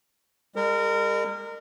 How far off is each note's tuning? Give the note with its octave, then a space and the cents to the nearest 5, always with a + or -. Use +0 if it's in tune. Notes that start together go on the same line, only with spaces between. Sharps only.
G#3 -45 A#4 -25